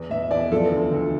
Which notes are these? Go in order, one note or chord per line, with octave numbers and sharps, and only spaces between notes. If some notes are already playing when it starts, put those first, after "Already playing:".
Already playing: E2
E2 E5
E3 D5
F3 A4
D2
D2